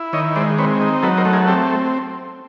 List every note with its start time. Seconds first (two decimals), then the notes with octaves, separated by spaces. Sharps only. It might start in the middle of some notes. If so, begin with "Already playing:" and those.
Already playing: E4
0.13 D#3 C#5 D#5
0.36 G#3 C5 D5
0.58 C4 B4 C#5
0.81 D#4
1.03 F#3 A4 B4
1.17 A#4 C5
1.25 A3
1.33 G#4 A#4
1.47 C4 G4 A4